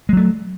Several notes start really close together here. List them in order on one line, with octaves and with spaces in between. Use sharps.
G#3 F#3 A3